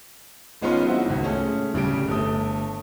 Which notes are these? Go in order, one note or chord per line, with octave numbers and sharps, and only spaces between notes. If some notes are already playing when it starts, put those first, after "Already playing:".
G#1 G#3 B3 C#4 F4 C6
F#3 C4 D#4 E4 F#4
G#1 C#2
A3 C#4 G#4
D1 C#3 G3 D7
G1 A3 D#6